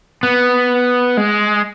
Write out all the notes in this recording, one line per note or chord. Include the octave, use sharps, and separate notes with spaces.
B3
G#3